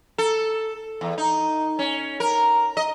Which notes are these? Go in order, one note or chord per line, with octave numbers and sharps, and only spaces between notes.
A4
E2
D#4
C#4
A#4
D#5